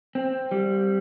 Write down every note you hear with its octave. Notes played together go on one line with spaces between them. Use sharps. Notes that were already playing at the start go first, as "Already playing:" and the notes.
C4
G3